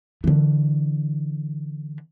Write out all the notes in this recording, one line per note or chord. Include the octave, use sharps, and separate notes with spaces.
D3 E3